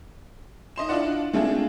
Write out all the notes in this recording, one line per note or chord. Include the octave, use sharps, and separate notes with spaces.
D#4 D#5 C6 E7
D4 E4 F4 D5 F#5
G#3 A3 C4 D4 F4 G#4